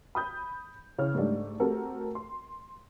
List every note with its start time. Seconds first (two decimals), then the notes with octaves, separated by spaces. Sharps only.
0.15 B5 D#6 G6
0.98 C#3 E4 C#5 F6
1.15 G#2 G3 A3 D4
1.60 A3 C4 F#4 G4 A4 A#4
2.15 C6